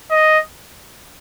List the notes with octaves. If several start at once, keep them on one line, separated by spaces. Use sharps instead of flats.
D#5